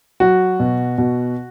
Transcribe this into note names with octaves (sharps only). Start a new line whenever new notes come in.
F#3 F#4
B2
B2